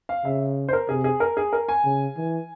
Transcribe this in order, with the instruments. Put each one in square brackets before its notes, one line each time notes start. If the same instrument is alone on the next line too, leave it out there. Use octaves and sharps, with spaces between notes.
[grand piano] F5
[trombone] C#3 [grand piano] E5
[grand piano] C5
A#4
[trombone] C3 [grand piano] G#4
[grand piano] G#4
A#4
G#4
A#4
G#5
[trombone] C#3
E3